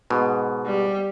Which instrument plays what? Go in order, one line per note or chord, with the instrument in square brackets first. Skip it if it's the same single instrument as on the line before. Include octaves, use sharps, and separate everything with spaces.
[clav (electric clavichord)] G#2 B2
[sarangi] G3